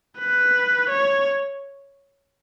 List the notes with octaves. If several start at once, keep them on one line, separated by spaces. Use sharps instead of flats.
B4
C#5